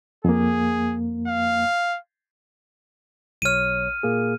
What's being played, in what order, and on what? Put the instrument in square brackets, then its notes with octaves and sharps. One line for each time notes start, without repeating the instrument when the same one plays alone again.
[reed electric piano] F2 A#3 [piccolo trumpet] G#4
[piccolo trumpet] F5
[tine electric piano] B1 C#5 [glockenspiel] F6 D#7
[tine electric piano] A#2 A#3 G#4